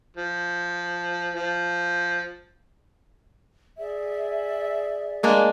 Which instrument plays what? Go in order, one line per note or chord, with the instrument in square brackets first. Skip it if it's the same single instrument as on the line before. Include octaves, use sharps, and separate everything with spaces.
[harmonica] F3
F3
[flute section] G#4 D5 E5
[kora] G#3 A#3 D4